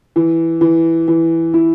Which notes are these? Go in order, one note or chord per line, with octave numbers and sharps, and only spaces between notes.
E3
E3
E3
E4